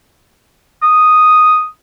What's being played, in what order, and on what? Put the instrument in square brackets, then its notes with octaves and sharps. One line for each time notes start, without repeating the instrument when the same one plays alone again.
[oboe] D#6